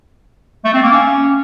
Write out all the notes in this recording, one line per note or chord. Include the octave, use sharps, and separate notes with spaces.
A3
C4
A#3
C#4